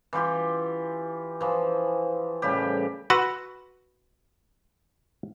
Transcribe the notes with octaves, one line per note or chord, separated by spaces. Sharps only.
E3 F4 G4 C6
E3 F3
A2 C#3 G3 G4
F#4 B4 B5 C6 E6